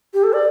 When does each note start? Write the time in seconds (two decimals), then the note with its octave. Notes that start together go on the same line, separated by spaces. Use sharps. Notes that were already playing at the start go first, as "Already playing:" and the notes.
0.14 G4
0.23 A4
0.33 D5